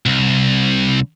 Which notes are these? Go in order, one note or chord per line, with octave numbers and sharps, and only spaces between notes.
C2